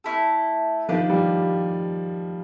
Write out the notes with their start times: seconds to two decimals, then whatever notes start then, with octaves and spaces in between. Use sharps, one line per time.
0.04 A3 C#4 E4 A4
0.89 D#3 F3 D4 G4 B4
1.10 F3 G3